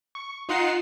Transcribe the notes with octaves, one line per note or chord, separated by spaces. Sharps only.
C#6
D#4 F4 D#5 F#5 C7 E7